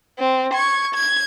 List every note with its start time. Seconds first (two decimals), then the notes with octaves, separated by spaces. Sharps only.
0.19 C4
0.54 C#6 G#6
0.95 G#6